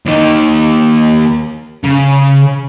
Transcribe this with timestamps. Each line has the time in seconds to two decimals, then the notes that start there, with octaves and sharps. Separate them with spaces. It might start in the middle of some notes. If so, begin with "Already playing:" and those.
0.06 D#2 D#4
1.84 C#3